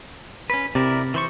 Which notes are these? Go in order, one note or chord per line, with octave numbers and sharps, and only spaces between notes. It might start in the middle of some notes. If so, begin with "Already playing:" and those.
C#4 B4
C3 E4 A#4 D5
E3 C5 C#6